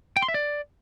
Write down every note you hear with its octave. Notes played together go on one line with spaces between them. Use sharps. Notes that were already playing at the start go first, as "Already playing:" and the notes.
G5
C6
E5
D5